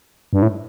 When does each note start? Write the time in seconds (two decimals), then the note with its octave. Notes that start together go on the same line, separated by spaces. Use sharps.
0.33 G2
0.42 A2